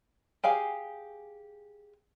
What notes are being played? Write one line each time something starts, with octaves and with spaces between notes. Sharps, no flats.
G4 G#4 F5 G#5